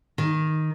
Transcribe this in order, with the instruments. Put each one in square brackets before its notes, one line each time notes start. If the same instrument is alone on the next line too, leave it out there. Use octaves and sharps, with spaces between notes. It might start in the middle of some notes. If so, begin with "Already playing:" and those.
[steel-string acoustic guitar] D#3